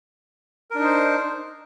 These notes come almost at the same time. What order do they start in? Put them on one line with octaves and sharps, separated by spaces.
A#4 D4 D#4 C5